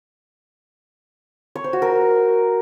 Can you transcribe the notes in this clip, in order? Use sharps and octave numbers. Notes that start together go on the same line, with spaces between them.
C#5
C5
F#4
A#4